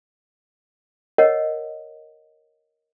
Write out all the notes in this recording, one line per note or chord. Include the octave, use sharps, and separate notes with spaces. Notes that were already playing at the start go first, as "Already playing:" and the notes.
A#4 C#5 D#5 F#5